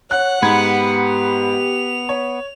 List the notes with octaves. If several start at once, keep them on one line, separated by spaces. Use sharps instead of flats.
C#5 F#5 F#6
G#2 B3 G4 B5 G#6
F7
C#5